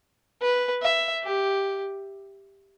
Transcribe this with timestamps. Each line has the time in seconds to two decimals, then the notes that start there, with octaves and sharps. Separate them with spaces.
0.42 B4
0.83 E5
1.23 G4